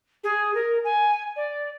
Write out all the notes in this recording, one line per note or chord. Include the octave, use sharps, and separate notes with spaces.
G#4
A#4
G#5
D5